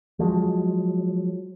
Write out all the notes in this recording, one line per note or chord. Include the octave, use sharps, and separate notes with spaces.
F3 F#3 G#3